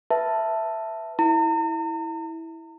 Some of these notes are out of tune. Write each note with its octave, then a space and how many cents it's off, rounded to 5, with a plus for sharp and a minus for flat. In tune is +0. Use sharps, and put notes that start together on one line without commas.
B4 +0 E5 +0 A5 +5
E4 -10 A#5 -45